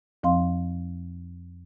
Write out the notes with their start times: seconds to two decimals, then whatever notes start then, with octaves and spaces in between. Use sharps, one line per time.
0.23 F2 F3 C4 F5 C6